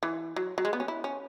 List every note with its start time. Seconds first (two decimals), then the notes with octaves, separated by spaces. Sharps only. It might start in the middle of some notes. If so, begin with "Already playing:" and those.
0.03 E3
0.36 F#3
0.58 F#3
0.65 G#3
0.73 B3
0.80 C#4
0.88 E4
1.04 C#4